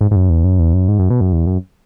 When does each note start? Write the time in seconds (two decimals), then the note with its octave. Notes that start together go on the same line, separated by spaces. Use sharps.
0.01 G#2
0.11 G#2
0.16 F#2
0.30 E2
0.44 F#2
0.59 E2
0.73 F#2
0.88 G#2
0.99 F#2
1.10 B2
1.21 F#2
1.33 E2
1.46 F#2